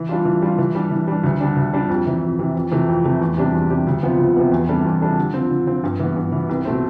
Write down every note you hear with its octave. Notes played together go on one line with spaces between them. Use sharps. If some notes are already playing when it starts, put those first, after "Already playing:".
Already playing: E3
G3 D4 F4
E3
G3 D4 F4
E3
G3 D4
E3
G3 D4
D2
D3 G3 D4
D2
D3 G3 D4
F2
C3 E3
F2
C3 E3
F2
C3 E3 A3
F2
C3 E3 A3
E2
C3 G3 D4 G4
E2
C3 G3 D4 G4
D2
C3 F3 B3
D2
C3 F3 B3
E2
C3 G3 D4 A4
E2
C3 G3 D4 A4
D3
F3 C4
D3
F3 C4
G2
E3 B3
G2
E3 B3
C2
B2 A3 C4